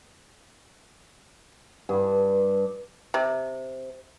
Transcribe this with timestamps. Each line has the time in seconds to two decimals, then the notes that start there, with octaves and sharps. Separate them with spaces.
1.89 G2
3.14 C3